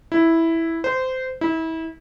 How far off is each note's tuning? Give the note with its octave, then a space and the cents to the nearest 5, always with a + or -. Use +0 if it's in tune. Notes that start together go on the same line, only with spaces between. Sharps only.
E4 -5
C5 -20
E4 -30